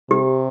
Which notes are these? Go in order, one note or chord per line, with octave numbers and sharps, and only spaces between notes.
C3 G4